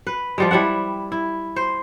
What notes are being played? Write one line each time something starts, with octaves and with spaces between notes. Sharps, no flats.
B4
F3 G3 G#3
G3 E4 E5 F#5
E4
C5